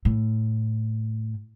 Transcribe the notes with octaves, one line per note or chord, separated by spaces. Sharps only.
A2